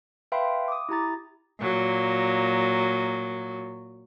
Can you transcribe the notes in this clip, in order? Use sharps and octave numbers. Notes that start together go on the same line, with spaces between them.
B4 E5 F5 G5 B5 C6
D6 D#6
E4 G4 A#5 A6
A#2 F#3